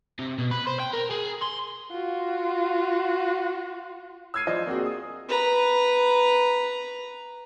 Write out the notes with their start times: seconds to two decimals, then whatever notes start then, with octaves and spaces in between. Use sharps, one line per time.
0.19 C3
0.39 B2
0.51 B4
0.67 C5
0.80 G5
0.93 A#4
1.11 G#4
1.42 C6
1.91 F4 F#4
4.34 E6 F6 G#6 C7 D#7
4.47 F3 F4 C5 D5 D#5
4.66 A#3 C4 F#4 G#4
4.86 D#6
5.29 B4 A#5